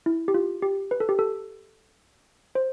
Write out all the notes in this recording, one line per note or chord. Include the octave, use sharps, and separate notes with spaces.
E4
G4
F4
G4
B4
A4
G4
A4
C5